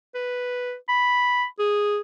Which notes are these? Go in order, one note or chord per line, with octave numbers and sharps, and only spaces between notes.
B4
B5
G#4